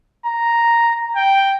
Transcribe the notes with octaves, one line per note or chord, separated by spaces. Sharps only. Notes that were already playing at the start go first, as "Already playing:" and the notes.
A#5
G5